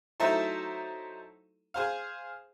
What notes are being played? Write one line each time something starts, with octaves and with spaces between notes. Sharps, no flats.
F#3 A3 D#4 E4 A4 C5
G#4 C5 F5